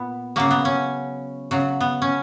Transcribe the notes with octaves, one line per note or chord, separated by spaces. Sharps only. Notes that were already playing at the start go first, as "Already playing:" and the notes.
Already playing: A#2 B3
C#3 F#3 A#3
B3
C#4
C#3 F#3
B3
C#4